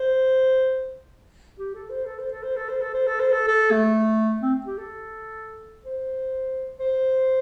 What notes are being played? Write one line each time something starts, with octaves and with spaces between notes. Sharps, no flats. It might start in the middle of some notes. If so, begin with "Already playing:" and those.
Already playing: C5
G4
A4
C5
A4
C5
A4
C5
A4
C5
A4
C5
A4
C5
A4
A4
A3
C4
G4
A4
C5
C5